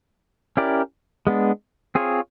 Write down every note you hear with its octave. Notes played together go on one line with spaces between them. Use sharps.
C#4 E4 G4 A#4 D5
G#3 B3 D4
C4 F4 G#4 C#5